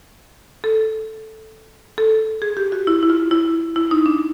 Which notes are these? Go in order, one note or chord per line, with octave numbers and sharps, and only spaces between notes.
A4
A4
G#4
G4
F#4
E4
E4
F4
E4
E4
D#4
D4